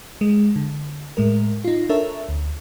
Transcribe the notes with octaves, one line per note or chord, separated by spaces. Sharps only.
G#3
D3
A2 G#3 A#4
D#4 F4
D4 A4 A#4 C#5 E5
D2